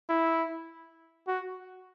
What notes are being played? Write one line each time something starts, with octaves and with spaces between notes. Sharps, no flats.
E4
F#4